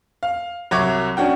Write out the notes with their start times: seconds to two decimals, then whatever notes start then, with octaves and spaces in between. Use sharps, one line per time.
0.23 F5
0.71 C2 F#3 C#5 D6 G#6
1.17 C#4 D4 F#4 G5